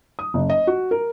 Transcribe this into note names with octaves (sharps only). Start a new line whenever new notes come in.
D#6
F#1
D#5
F#4
A#4